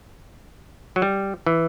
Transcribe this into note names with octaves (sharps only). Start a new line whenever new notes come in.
F#3
G3
E3